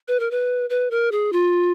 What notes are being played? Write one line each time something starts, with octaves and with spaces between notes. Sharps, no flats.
B4
A#4
B4
B4
A#4
G#4
F4